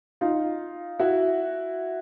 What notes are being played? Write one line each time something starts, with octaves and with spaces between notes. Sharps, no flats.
D#4 F4
E4 F#4